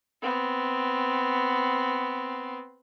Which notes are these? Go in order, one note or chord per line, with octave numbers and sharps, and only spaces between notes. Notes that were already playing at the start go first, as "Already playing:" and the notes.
B3 C4